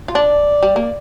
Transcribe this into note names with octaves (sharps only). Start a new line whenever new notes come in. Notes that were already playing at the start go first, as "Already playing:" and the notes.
F4
D4 D5
G3
A#3